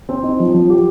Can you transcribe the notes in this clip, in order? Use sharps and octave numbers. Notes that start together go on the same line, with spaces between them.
C4
D#4
F3
F3
G4